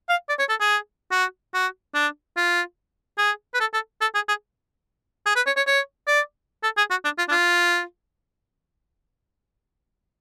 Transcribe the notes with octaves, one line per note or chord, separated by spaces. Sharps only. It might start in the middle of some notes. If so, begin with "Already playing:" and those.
F5
D5
C#5
A4
G#4
F#4
F#4
D4
F4
G#4
B4
A4
A4
A4
G#4
G#4
G#4
B4
C#5
C#5
C#5
D5
A4
G#4
F#4
D4
F4
D4
F4